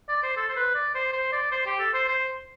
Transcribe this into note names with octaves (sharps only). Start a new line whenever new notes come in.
D5
C5
A4
C5
B4
D5
C5
C5
D5
C5
G4
A4
C5
C5